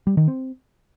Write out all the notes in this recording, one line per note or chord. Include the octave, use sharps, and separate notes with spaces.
G3
D#3
C4